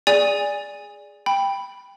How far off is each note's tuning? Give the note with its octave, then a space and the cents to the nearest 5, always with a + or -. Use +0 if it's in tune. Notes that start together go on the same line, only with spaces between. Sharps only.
G#4 +0 D5 +0 G#5 -20
G5 +10 B5 +0